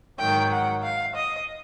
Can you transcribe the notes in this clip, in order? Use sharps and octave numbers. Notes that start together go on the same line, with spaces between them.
G#2 D#3 F#3 G5
F#5
F5
D#5